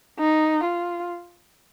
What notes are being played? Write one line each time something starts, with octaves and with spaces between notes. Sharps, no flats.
D#4
F4